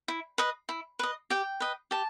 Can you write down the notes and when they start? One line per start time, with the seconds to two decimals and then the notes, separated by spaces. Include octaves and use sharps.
0.08 E4
0.38 B4 D#5
0.69 E4
0.99 B4 D#5
1.30 G4 G5
1.60 B4 D#5
1.91 G4 A5